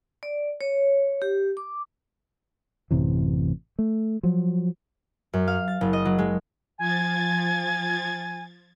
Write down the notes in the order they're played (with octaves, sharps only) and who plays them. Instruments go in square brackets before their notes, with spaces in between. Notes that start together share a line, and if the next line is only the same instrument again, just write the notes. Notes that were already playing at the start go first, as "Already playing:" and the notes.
[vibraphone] D5
C#5
G4
D6
[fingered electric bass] A1 F#2 C3 E3
A3
F3 F#3
[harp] F#2
F5
A6
F#1
D#5
F#3
G#3
[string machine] F3 G#6 A6 [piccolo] G#5